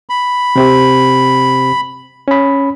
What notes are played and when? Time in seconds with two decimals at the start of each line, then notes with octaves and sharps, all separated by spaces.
0.09 B5
0.56 C3 C4 G4
2.28 C#4 B5